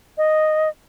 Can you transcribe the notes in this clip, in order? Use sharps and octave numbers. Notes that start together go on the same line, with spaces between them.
D#5